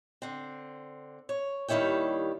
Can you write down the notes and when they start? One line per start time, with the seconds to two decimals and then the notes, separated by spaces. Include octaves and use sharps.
0.22 D3 C4
1.29 C#5
1.68 D#2 D#3 G3 E4 C#5 G5